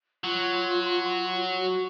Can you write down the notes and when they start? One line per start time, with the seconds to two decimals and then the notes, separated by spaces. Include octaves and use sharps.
0.24 F#3 F4
1.60 F#4